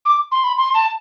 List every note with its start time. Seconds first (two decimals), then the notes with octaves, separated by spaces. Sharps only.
0.06 D6
0.32 C6
0.44 B5
0.58 C6
0.74 A5